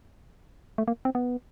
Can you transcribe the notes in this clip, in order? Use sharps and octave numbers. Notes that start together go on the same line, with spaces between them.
A3
A#3
C4
B3